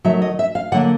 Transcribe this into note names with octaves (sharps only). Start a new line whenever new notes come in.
D#3 F#3 A3 E5
D#5
E5
F5
D3 F#3 A#3 F#5